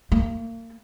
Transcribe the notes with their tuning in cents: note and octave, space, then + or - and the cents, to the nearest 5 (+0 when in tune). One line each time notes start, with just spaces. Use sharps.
A#3 -35